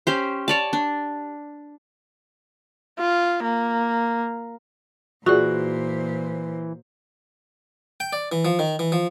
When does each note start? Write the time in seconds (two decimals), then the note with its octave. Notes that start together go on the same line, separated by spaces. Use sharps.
0.07 C#4 G4 C5
0.48 C#5 D5 A5
0.73 D4
2.99 F4
3.44 A#3
5.26 A#2 E3 F4 F#4 G#4 C5 D5
8.00 G5
8.13 D5
8.32 E3
8.45 F3
8.59 D#3
8.79 E3
8.92 F3